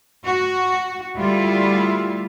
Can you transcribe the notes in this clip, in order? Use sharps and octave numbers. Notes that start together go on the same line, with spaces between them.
F#4
D2 G3 E4 F4